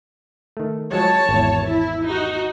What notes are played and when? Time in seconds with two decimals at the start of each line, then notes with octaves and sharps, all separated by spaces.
0.57 D#3 A3
0.92 F3 F#3 G#3 C#5 A5
1.29 G#1 E2
1.67 E4
2.06 D#4 F#4